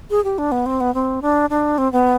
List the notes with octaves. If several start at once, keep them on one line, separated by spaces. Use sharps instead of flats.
G#4
G4
D4
B3
C4
B3
C4
D4
D4
C4
B3